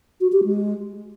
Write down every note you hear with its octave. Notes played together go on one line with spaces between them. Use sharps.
F#4
G4
G#3